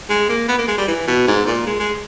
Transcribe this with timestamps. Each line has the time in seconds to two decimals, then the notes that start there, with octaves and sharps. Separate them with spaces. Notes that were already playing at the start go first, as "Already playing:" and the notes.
0.09 G#3
0.29 A#3
0.48 B3
0.58 A#3
0.68 G#3
0.78 G3
0.88 E3
1.07 B2
1.27 G#2
1.46 A#2
1.66 G#3
1.79 G#3